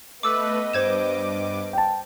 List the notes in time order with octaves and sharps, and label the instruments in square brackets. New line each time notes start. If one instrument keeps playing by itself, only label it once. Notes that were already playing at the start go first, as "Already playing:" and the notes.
[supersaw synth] A3 B4 [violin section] B3 D#5 [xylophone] D6 E6
[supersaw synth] G2 D6 [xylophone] C5 G#6 E7
[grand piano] G5 A5